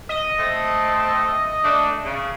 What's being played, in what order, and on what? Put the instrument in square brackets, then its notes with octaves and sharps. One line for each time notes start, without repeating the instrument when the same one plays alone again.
[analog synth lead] D#5
[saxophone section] A3 C4 A4
A3 D4
C#3